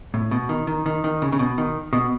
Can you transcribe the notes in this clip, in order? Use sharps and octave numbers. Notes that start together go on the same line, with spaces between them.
A2
B2
D#3
D#3
D#3
D#3
C#3
C#3
B2
D#3
B2